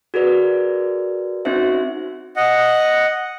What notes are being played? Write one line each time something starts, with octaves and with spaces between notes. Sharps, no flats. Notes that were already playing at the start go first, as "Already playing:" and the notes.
F#4 G#4 A#4 B4 D5
C4 C#4 D#4 F#4 C5 E5
D#5 F#5